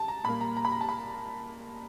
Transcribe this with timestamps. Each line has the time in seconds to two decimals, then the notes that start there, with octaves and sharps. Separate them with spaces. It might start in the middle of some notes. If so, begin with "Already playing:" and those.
Already playing: A5
0.08 A#5
0.24 A#2 G3 A#3 B5
0.41 A#5
0.57 A#5
0.65 B5
0.72 A#5
0.81 A5
0.89 B5